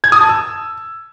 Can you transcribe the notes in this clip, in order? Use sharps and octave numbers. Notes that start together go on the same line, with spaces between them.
G#6
D#6
A5
E6